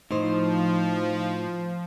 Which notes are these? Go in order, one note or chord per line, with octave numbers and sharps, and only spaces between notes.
A2 F3 D#4 C5